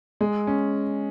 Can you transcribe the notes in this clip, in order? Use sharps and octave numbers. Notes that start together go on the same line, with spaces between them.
G#3
C#4